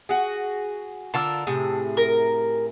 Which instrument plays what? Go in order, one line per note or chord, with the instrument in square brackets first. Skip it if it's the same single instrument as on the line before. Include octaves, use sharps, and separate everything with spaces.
[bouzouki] F#4 G#4
[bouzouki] D3 F4 A#4 [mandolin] A5 E6
[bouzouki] A2 C3 G#4
[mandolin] A#4